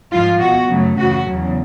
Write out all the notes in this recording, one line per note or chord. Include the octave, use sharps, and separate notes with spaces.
G#2 F3 G#3 F4
B2 G#3 F#4
F#2 C#3 F#3 A3
F#2 C#3 E3 A3 F#4
E2 C#3 F#3